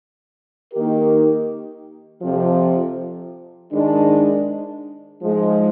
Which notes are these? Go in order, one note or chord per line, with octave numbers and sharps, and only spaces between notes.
D#3 A#3 D#4 G4 A#4
F2 C3 F3
G#2 D#3 G#3 D4
G#2 F3 G#3